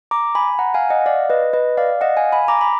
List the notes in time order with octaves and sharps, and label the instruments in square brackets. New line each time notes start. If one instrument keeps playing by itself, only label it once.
[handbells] A#5 D6
G#5 B5
F#5 A#5
F5 G#5
D#5 F#5
D5 F5
B4 D#5
B4 D#5
D5 F5
D#5 F#5
F5 G#5
G#5 B5
A#5 D6
B5